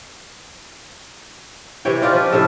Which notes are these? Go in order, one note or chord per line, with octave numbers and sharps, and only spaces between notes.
C3 E3 C#5 G5
C#4 D#4 F4 D5
F3 B4
A2 C3 C#4 A4